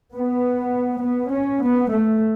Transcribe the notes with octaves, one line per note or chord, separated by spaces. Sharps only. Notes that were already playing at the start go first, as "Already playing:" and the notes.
B3
B3
C#4
B3
A3